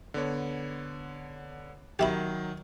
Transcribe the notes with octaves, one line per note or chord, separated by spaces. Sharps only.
D3 B3 C#5
D#3 F#3 G4 E5 B5